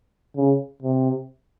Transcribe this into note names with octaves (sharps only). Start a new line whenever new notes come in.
C#3
C3